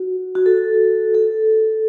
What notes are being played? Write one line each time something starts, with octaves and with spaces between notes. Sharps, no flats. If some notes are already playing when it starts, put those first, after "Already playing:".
Already playing: F#4
F#4
A4
A4